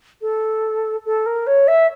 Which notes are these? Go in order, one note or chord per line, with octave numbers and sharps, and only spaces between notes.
A4
A4
A#4
C#5
E5